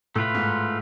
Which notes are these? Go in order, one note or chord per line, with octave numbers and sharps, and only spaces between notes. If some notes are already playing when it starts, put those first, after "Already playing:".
A2 A3 F4 B4
G#2